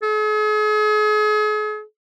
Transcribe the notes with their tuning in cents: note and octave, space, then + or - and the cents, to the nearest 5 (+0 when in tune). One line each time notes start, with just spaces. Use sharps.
G#4 +40